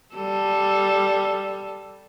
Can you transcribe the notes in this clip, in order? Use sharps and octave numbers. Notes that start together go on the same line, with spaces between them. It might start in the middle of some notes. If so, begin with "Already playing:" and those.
G3 A4